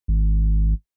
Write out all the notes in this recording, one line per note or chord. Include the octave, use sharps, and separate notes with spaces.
G#1